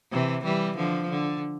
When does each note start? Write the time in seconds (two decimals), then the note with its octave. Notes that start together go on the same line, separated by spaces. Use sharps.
0.12 C3 E3
0.44 E3 G3
0.77 D3 F3
1.10 D3